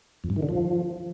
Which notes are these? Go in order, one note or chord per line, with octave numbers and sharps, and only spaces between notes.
F2
G2
D#3
D3
F3